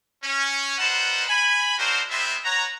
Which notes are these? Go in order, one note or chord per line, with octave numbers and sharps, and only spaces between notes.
C#4
G3 D#4 B4 C5 F#5 A5
G#5 B5
D4 D#4 F#4 A#4 C5
G#3 B3 C4 C5 E5
B4 C#5 F#5 A#5